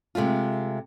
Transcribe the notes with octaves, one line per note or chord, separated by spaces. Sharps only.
C3 G#3 A3 F4